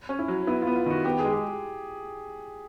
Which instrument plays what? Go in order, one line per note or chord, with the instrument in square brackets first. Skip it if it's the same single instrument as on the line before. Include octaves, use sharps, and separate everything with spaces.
[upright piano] C#4
[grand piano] E4
[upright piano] F#3
[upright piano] B3 [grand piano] E4
[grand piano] F4
[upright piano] B3
[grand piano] F4
[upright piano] D#3 [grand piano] F#4
[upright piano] B3 [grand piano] G4
[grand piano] G#4
[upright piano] G#3
[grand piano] G4